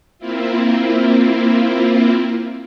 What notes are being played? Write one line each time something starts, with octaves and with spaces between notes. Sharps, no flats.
A#3 C4 E4 F4